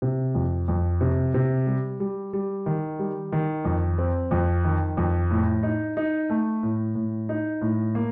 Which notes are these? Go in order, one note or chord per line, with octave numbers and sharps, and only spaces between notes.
C3
F2
F2
C3
C3
G3
G3
G3
D#3
G3
D#3
F2
C4
F2
D#3
F2
A2
D#4
D#4
A3
A2
A2
D#4
A2
A#3